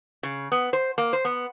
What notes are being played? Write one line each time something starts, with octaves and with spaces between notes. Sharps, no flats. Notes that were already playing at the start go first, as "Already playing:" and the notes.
C#3
B3
C5
A#3
C5
B3